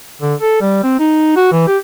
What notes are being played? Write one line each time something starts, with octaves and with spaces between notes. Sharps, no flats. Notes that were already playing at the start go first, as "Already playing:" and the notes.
D3
A4
G3
C4
D#4
F#4
E3
G4